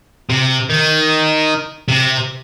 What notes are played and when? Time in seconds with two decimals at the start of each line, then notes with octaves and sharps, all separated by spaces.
0.30 C3
0.70 D#3
1.88 C3